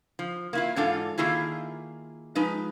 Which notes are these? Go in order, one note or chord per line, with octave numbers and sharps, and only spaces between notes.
F3
A#3 E4 F4
G#2 E3 D4 F4 A4 F5
D#3 A#3 E4 F4 G#4
F3 G#3 D#4 B4